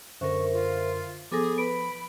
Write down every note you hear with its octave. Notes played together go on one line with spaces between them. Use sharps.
F#2 D3 A#4 C5 E5 C#6
F4
F3 B3 G#4 A4 D6 A#6
B4 B5 D7